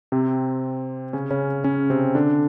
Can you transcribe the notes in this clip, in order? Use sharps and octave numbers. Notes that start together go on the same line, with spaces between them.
C3 C4
C#3 C#4
C#3 C#4
C#3 C#4
C3 C4
D3 D4